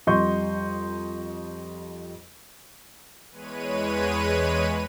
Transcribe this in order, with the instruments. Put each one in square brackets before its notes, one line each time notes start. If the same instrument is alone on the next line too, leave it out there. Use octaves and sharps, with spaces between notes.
[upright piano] F2 G3 D#5 C6 C#6 G6
[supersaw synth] E2 G#3 B4 C#5 D#7